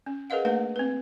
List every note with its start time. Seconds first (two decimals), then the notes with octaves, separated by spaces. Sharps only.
0.06 C#4
0.30 G#4 A#4 B4 D#5 F5 F#5
0.45 A3 A#3 D4 B4 F#5
0.76 C4 B4